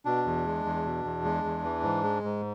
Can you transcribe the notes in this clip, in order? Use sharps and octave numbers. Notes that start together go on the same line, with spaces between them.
B2 D4
E2
G#3
E2
B2
E2
G#3
E2
E3
G#2
G#3
G#2